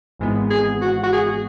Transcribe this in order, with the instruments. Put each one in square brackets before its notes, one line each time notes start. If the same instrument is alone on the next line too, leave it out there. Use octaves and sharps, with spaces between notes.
[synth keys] G#1 G#2 E3 G#3 B3
[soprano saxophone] G#4
F#4
F#4
G#4